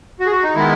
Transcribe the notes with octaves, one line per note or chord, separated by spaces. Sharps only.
F#4
G#4
F#4
D#4
D#3 G#3 B3 E4